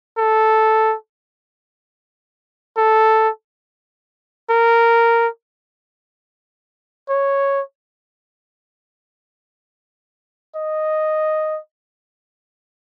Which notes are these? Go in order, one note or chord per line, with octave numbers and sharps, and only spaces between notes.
A4
A4
A#4
C#5
D#5